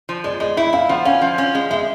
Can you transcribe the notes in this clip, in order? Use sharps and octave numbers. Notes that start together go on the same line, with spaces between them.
F3
G#3 D5
G#3 D#5
E4 E5
E4 F5
F3 F#5
C#4 F5
F3
C#4
G#3
G#3 E5